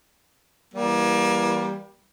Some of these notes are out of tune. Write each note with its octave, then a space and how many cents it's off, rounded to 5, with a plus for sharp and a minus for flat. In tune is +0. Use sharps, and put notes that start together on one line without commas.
E3 +10 G3 +0 A#3 +30